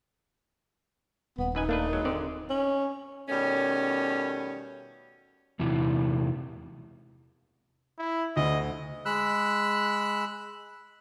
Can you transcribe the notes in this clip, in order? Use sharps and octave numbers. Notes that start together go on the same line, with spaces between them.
D#1 B3
F#2 D#4 B4 G#5
A3 A#3 D4 B4
F#3 G#3 A#3
G#1 D3 C4 D5
C#4
B2 D#3 G3 A3 C#4
E2 C3 E3
E4
D2 D3 D#5
G#3 B5 E6 F#6